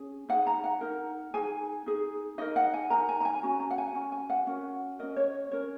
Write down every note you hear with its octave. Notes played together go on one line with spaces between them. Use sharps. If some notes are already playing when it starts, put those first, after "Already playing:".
Already playing: C#4 G#4
D#4 G#4 F#5
A#5
F#5
D#4 A#4
D#4 G#4 G#5
D#4 G#4
D#4 A#4 D#5
F#5
G#5
D#4 A#4 A#5
G#5
A#5
G#5
C#4 F#4
A#5
F#5
G#5
C#4 F#4
G#5
F#5
C#4 F#4 A#4
C#4 A#4 D#5
C#5
C#4 A#4 C#5